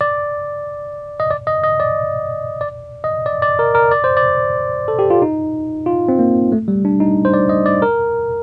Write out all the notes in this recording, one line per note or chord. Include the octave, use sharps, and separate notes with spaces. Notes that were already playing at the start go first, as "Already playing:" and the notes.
D5
D#5
D5
D#5
D#5
D5
D5
D#5
D5
D5
A#4
A#4
D5
C5
D5
A4
G4
F4
D#4
F4
C4
A#3
A3
G3
D4
D#4
C5
D5
D#5
D5
A#4